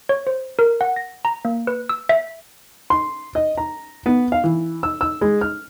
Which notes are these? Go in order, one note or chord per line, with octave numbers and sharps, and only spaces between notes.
C#5
C5
A#4
F#5
A#6
A#5
A#3
B4
E6
E5
C6
D#5
A#5
B3
F5
E3
E6
E6
G#3
F6